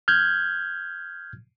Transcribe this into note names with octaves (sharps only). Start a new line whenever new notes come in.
F6 G6 G#6